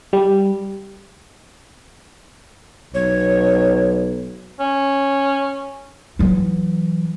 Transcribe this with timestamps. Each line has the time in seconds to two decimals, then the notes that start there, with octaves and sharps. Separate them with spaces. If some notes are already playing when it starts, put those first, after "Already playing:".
0.13 G3
2.94 B1 C#5
4.60 C#4
6.19 E3 F#3